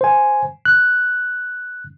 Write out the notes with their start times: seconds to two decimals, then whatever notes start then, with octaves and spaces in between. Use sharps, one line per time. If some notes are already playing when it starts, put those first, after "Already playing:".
0.01 C5 G#5
0.65 F#6